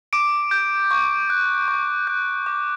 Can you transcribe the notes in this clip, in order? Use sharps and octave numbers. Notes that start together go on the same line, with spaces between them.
D6 D7
G6
C#6
F#6
C#6
F#6
D6